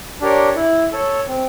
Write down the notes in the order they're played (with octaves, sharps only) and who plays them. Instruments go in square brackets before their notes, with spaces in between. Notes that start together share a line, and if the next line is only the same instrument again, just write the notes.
[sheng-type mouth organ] D4 G4 A#4 C#5
E4
A4 C#5
C4